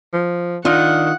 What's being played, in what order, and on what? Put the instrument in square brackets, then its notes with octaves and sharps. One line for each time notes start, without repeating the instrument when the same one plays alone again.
[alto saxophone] F3
[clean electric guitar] D#3 [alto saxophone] D4 [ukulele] F4 [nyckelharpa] F#5